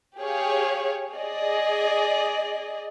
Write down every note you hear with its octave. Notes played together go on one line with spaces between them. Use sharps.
G4 G#4 C#5 F5
G#4 D5 D#5